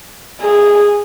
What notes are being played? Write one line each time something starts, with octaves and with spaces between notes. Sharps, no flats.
G#4